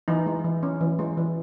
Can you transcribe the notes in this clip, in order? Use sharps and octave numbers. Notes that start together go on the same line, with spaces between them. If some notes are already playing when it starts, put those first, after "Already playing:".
E3 D#4
G#3
E3
C#4
E3
G#3
E3